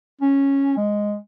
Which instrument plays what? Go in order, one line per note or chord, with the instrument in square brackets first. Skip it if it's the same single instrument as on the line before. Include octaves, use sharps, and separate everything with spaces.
[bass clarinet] C#4
G#3